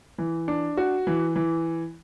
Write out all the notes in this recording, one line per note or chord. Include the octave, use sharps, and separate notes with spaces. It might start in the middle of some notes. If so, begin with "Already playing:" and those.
E3
D4
F#4
E3
E3